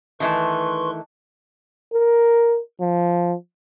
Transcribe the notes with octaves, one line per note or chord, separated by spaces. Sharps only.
D#3 E3 A3 B4 C6 C#6
A#4
F3